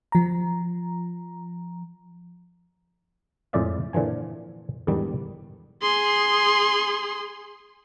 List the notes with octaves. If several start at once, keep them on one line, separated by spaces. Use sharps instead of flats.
F3 A#5
F2 A2 G#3 D5 E5 F5
A#2 D3 E3 F3 G#5
E2 G#2 D3 D#3 G3
G#4 C6